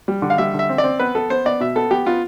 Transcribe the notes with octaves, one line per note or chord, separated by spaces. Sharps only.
G3
D3
F5
G3 E5
D3
E5
C4
D5
C4
B3 B4
B3 A4
B3 C5
B3 D5
B2 E5
B3 A4
B3 G4
B3 F4